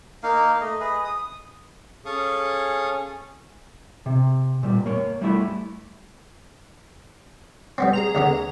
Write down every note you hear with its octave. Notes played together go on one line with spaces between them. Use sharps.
A#3 D#4 F5
A3 D#5
G#4 B4 D#5
D#6
C#4 G#4 A4 F5 C#6 D#6
C3
A#2 G3
A#3 C#5
G3 A3 E4 A4
G3 B3 C4
G#4 A#5 F7
D#2 D3 B3